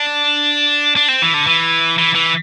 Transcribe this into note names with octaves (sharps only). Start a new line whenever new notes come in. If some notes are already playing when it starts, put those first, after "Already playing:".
Already playing: D4
D4
C4
E3
D3
E3
E3
E3